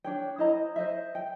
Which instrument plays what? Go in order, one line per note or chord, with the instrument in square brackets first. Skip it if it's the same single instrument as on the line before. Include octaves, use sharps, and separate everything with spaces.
[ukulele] D4 C#5 G5
E4 C5 D#5 A#5
C5 D#5 E5
G5